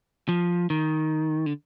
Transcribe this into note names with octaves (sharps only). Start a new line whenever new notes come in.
F3
D#3
D3